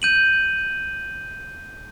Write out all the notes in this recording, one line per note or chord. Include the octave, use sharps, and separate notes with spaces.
G6 D#7 F#7